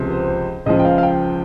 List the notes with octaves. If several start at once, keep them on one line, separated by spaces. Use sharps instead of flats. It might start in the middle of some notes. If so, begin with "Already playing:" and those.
Already playing: C#2 C3 F3
C5
C#2 C#3 F3 D#5
G5
F5
F5
G5